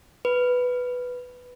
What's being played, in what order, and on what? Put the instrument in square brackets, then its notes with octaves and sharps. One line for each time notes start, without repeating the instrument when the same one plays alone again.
[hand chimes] B4